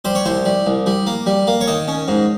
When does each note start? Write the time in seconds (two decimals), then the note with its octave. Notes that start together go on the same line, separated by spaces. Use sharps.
0.05 G3 C5
0.15 C#5
0.26 C2 C5
0.45 G3
0.66 C2
0.86 G3
1.07 A#3
1.26 G3
1.47 A#3
1.61 C#5
1.68 D#3 D#5
1.88 C#4
2.08 G#2